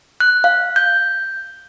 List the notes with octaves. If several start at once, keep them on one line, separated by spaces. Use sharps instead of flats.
F#6
F5
G6